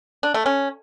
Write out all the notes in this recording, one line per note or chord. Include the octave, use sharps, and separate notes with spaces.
D4
A3
C#4